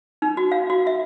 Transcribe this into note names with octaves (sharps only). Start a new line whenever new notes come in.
D#4
F#4
F5
F#4
E5